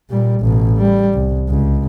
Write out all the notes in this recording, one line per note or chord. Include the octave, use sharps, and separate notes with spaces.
A#2 G3
A1 B2
G3
C2
C#2